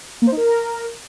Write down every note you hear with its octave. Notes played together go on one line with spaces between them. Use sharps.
A#3
C5
D#4
A#4